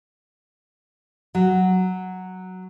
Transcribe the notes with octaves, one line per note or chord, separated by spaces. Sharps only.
F#3